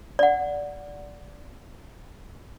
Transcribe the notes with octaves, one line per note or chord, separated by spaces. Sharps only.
D5 F#5